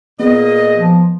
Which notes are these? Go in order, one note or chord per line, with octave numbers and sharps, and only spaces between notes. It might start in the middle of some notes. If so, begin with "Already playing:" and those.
A#2 B3 G#4 D#5
F3